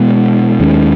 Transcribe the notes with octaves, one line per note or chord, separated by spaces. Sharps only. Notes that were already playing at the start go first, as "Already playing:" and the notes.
Already playing: B2 G#3 B3
D#2 D#3 G#3 C#4